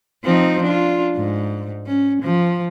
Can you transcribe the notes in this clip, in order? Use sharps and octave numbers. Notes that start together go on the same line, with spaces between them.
F3 C4 D#4
D4 F4
G#2
C#4
F3